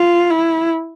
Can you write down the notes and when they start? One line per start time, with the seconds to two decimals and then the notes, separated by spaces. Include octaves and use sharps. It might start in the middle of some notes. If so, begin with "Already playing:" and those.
Already playing: F4
0.31 E4